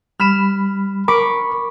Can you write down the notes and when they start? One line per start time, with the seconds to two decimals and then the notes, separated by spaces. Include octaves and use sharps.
0.20 G3 B5 F6 E7
1.08 A#4 B5 C#6 D6